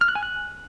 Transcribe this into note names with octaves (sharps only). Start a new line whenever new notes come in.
F6
F#6
G#5
F#6